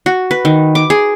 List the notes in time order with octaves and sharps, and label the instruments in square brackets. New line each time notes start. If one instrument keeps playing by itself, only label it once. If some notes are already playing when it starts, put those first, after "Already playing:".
[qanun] F#4
B4
D#3
D6
G#4